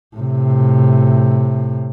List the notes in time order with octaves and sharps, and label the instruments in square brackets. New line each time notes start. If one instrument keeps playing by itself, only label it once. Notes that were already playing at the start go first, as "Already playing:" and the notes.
[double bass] A2 C3